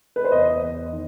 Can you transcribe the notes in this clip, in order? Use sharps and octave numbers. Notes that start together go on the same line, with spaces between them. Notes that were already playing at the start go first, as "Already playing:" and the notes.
B4
C5
E2 D#5
E2
D#3